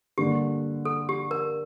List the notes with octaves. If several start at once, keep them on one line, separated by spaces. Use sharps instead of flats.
D3 G3 A#3 G4
A4
G4
A#4